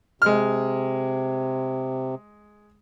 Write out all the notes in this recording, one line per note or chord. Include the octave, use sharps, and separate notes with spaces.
C3 G#3 F6